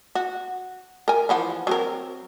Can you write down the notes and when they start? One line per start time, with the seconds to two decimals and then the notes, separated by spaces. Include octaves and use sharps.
0.15 F#4
1.08 A#4 G#5
1.29 E3 F3 F#5
1.67 F#3 C4 A#4